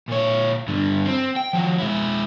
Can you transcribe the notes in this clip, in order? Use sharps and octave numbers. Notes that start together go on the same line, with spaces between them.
A#2 C#5
G2 D3
C4
G5
F3 F#4
G#3 E4